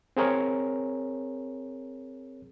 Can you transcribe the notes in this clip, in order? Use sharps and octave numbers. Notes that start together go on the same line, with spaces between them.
C4 G#4 A#4 C#5